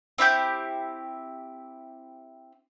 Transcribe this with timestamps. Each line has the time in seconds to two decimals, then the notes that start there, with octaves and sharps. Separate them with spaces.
0.18 C4 E4 G4 G6